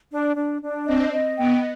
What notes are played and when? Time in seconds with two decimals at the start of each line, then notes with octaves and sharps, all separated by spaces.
0.11 D4
0.35 D4
0.62 D4
0.86 C4 D#5
1.12 D#5
1.38 B3 G5